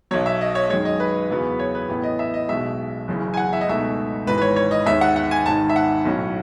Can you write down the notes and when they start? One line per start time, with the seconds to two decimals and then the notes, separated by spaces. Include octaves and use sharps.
0.11 B1 B2 F#3 C#5
0.26 E5
0.41 D#5
0.55 C#5
0.70 F#2 D#3 G#3 C#5
0.85 D#5
1.00 B4
1.30 E2 C#3 F#3 B3
1.59 C#5
1.75 B4
1.89 A1 A2 E3 B3
2.03 D#5
2.19 E5
2.34 D#5
2.48 B1 B2 G#3 E5
3.08 F#1 F#2 C#3 E3
3.34 G#5
3.37 F#5
3.53 E5
3.61 D#5
3.68 C#2 B2 A3 D#4 E5
4.27 G#1 G#2 E3 B4
4.38 B4
4.41 C#5
4.56 C#5
4.71 D#5
4.86 D#2 D#3 G#3 E5
5.01 F#5
5.16 F#5
5.31 G#5
5.46 G#1 G#2 D#3 A5
5.69 E5
5.76 F#5
6.05 B1 A2 F#3 C#4